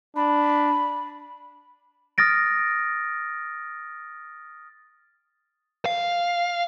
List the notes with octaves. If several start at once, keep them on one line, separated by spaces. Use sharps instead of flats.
D4 B5
D#6 F6 A6 A#6 D7
F5